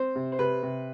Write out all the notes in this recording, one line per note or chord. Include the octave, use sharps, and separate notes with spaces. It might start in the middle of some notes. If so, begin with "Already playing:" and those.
Already playing: C4 C5
C3
C5
C3 B4
C3